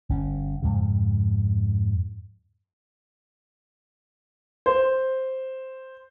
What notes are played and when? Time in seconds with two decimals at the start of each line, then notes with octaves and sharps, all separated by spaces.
0.09 G1 C#4
0.62 F2 G#2 C#3
4.66 C5